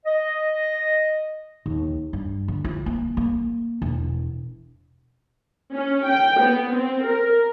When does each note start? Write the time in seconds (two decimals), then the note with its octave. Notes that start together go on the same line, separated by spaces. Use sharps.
0.06 D#5
1.66 D#2
2.13 G2
2.48 D3
2.64 F4
2.86 A#3
3.17 A#3
3.82 E1
5.74 C#4
6.08 G5
6.40 B3
6.74 C4
7.06 A#4